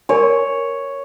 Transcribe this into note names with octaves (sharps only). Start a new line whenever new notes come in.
A#4 C#5 D5 G#5